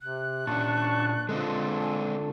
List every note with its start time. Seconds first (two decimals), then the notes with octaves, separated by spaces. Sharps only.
0.02 C3 F#6
0.47 A#2 C#4 D4 A5 C#6
1.29 D3 G#3 C4 D4 F4 A4 D#5
1.81 G#5